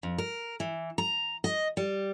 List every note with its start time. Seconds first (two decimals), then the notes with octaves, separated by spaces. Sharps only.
0.03 F2
0.18 A#4
0.60 E3
0.98 A#5
1.44 D#5
1.77 G3